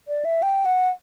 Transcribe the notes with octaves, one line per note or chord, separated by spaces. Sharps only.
D5
E5
G5
F#5